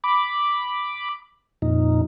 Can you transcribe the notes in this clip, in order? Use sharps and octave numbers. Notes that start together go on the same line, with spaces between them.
B5 D6
F2 A#2 D#4